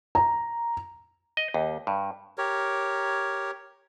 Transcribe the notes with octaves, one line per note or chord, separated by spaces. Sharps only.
A#5
D#5
D#2
G2
G4 A#4 C#5